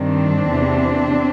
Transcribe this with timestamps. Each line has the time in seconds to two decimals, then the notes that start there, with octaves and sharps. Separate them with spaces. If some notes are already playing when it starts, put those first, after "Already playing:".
Already playing: G2 D#3 C4 D4
0.49 E2 C3 E3